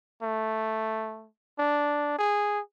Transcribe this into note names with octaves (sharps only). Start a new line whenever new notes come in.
A3
D4
G#4